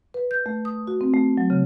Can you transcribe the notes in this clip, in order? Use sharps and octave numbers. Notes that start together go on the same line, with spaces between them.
B4
G6
A3
D#6
F#4
C4
A3
F#3
C#3